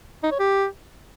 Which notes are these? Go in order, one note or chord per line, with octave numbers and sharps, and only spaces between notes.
D#4
C#5
G4